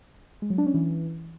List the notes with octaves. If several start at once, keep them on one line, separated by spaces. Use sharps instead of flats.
G#3
F#3
D4
C#4
E3